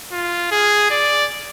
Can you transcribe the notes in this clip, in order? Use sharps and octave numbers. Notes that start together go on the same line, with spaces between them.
F4
G#4
D5